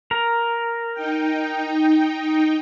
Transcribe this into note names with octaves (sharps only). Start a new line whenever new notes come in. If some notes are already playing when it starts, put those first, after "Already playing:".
A#4
D#4 G5